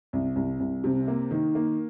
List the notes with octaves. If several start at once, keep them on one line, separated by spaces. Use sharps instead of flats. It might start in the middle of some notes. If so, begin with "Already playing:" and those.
C2
C2
C2
C3
A#3
D#3
A#3